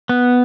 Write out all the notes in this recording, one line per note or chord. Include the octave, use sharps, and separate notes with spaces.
B3